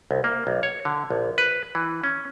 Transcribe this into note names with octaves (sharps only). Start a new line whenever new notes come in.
C2
A#3
B1
C#5
D3
A#1
B4
E3
C#4